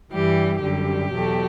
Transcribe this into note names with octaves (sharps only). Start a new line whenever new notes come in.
G2 E3 G3 G4
F#2 D3 G3 G4
E2 B2 F#3 A3